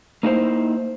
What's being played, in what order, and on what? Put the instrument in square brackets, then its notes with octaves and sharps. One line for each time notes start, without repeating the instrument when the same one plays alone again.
[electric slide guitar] A#3 D#4 E4 A4 C5